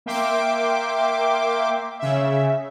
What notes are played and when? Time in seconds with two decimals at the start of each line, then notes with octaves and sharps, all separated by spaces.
0.06 A#3 E5 G5 C6 D6
1.99 C#3 E5